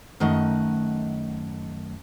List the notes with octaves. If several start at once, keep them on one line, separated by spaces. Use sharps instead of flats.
F#2 D#3 A3 D#5 F#5